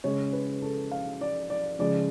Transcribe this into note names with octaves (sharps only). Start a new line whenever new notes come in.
C#3 G#3 C#5
B4
A4
F5
D5
D5
C#3 F3 G#3 D5